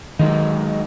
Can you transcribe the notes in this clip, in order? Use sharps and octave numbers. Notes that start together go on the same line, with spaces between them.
D#3 F#3 G#3 D#4